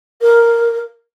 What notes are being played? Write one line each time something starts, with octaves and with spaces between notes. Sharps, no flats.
A#4